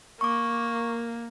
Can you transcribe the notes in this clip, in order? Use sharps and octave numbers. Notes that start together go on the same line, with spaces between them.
A#3 C#6 D6